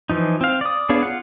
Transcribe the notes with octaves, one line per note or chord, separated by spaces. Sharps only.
E3 F3 D#4
C4 F5
D5 D#6
B3 D4 G#4 C#5 F5
F4 F5 F#5